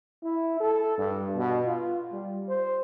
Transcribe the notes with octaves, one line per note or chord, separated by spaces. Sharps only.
E4
A4
G2
B2
F4
G3
C5